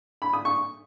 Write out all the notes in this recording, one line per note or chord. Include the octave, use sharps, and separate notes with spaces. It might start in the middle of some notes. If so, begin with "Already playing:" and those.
B5
D#6
C#6